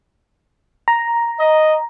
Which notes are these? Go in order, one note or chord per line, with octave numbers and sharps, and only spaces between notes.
A#5
D#5